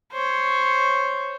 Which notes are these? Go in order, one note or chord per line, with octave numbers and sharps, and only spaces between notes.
C5 C#5